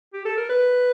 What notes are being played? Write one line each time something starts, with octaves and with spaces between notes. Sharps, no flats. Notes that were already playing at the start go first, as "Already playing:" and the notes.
G4
A4
A#4
B4